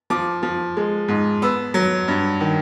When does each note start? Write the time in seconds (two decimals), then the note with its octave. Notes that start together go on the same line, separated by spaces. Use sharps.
0.10 F3 D6
0.43 F3
0.77 G#3
1.08 G#2
1.42 B3 E6
1.74 F#3
2.08 G2
2.40 D#3